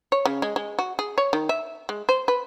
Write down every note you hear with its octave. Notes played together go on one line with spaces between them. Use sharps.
C#5
C#3
G#3
G#3
F#4
G#4
C#5
D#3
E5
G#3
C5
B4